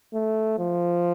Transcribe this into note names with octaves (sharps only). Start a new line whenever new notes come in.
A3
F3